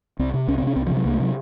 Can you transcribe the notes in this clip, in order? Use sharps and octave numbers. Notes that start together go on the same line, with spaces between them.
C2 C4
C3
C2 C#4
C4
C3 C#4
C2 C4
F3
C3
F#3
C2 A#3
A3
C3 F#3